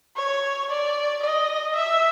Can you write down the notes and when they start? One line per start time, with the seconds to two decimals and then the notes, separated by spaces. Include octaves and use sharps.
0.16 C#5
0.70 D5
1.22 D#5
1.75 E5